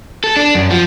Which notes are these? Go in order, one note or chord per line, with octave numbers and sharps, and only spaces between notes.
A4
D4
F#2
F3